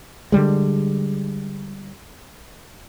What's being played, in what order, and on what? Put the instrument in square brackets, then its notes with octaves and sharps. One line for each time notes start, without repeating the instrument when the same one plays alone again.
[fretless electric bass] D3 E3 G3 G#3